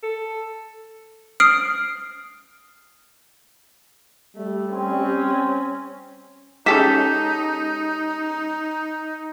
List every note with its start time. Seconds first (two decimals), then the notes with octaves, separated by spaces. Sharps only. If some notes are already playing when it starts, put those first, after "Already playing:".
0.03 A4
1.40 D#6 F6 C7 D7
4.36 G3 A3
4.73 C4 C#4
6.66 G#3 C#4 D#4 G4 A4 B6 E7